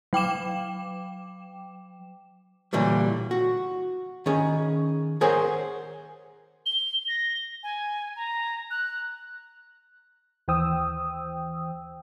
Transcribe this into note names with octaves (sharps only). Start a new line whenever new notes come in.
F#3 G5 D6 E7
A#2 D3 E3 F#3 G3
F#4
D#3 C#4 G#4
G#4 A#4 C5 C#5 F#5 G#5
G7
A#6
G#5
A#5
F#6
D#2 E3 C5 G5 D#6 E6